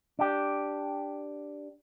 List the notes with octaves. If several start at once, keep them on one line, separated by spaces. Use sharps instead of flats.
D4 G4